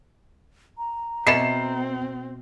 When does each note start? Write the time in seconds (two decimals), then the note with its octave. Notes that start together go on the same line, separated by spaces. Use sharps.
0.78 A#5
1.27 B2 C4 E4 A4 C7 E7